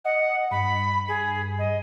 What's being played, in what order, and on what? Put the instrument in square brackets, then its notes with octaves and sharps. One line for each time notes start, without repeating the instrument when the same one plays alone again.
[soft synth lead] D#5 [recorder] F#5
[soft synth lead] G2 [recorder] B5
[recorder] G#4
D#5